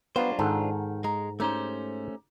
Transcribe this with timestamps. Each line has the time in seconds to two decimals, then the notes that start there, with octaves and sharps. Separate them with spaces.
0.16 F#3 G3 B3 D4 F4 C5 F5
0.39 G#2 D#3 A4 F#5
1.04 G#3 A#5
1.40 A3 C#4 D#4 G4 C5